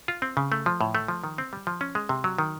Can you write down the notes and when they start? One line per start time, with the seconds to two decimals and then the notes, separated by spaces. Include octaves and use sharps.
0.08 F4
0.22 C4
0.37 C#3
0.52 A3
0.66 F3
0.81 A2
0.95 A3
1.08 F3
1.24 D#3
1.38 C4
1.53 G3
1.67 F3
1.81 C#4
1.95 G#3
2.09 C3
2.24 F#3
2.38 D#3